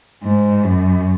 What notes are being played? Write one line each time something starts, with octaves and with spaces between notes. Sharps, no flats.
G#2
F#2